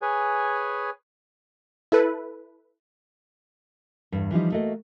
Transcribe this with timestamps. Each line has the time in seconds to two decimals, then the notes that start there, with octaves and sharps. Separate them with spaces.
0.02 G#4 B4 C#5 G#5
1.92 E4 A4 B4
4.12 E2 G2
4.31 E3 F3 G3 D#4
4.52 A3 A#3 F#4 D#5